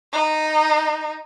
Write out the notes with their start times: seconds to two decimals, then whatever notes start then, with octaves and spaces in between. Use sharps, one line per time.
0.12 D#4